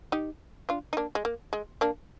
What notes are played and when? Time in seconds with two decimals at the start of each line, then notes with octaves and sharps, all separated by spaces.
0.12 D#4 G4
0.69 D4 F4
0.93 D#4
0.97 A#3 D4
1.15 G#3
1.25 A#3
1.53 G#3
1.81 A#3 D4